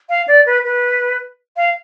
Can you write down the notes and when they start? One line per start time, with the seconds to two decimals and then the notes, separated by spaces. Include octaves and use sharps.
0.09 F5
0.28 D5
0.46 B4
0.65 B4
1.57 F5